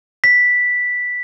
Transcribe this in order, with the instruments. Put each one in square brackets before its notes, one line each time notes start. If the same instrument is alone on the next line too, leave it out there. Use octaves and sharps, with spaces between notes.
[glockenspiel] B6